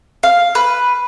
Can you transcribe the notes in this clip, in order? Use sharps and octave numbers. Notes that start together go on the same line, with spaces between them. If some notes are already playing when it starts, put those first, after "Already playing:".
F5
B4